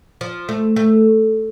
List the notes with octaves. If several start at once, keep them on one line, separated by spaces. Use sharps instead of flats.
F3
A3
A3